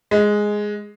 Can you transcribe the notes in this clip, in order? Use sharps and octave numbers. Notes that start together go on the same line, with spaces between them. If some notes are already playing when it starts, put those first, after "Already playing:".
G#3